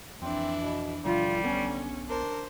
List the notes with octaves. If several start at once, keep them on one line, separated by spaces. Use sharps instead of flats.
F2 E3 C4 D4 E4
B2
D#1 B2 D3 F3 G3 F4
B1 B3 C#4
D4 A#4 C5